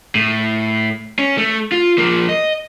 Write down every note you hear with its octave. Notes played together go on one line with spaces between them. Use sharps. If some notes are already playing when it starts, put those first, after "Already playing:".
A2
C#4
A3
F4
F3 A#3
D#5